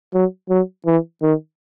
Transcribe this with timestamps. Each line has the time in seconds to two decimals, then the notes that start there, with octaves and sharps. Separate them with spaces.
0.14 F#3
0.49 F#3
0.86 E3
1.22 D#3